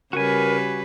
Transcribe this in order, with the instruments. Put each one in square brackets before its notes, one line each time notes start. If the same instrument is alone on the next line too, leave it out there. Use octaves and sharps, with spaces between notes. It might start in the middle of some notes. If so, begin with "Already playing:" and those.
[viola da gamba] C#3 G3 B4 [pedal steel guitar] F#4 G#5 [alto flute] A#4